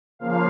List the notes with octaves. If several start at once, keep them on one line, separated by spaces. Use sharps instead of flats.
C#3 F3 A#3 F5